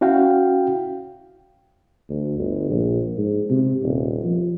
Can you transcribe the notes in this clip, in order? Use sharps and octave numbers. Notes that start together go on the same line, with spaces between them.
C#4 E4 F#4 F5 G5
D2
G1
A#1
G#2
C3
D#1
F3